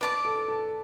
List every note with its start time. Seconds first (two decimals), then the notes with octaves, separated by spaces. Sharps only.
0.01 B4 D5 A5 D6
0.25 A4
0.48 A4